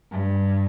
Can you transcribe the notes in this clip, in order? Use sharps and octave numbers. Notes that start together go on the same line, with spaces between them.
G2